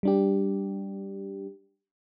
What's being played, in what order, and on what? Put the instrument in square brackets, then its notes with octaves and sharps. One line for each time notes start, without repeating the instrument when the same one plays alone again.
[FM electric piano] G3 D4 G4